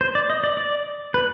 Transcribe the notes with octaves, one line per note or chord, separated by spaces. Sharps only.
C5
D5
D#5
D5
D5
B4